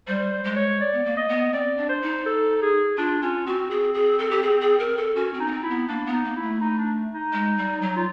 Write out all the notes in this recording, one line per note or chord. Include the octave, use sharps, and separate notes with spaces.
G3 C5
C5
G#3
C#5
D5
B3
A#3
D#5
B3
C4 D5
D4
C5
D#4
A4
G#4
D4 F4
C#4 F4
C4 F#4
G#4
G#4
A4
G4
G#4
G#4
A#4
A4
C#4 F#4
C4
D#4
B3
C4
E4
B3
A#3 D4
B3
D#4
A#3
E4
A3
D#4
D4
D#4
G#3
G3
F#3
F4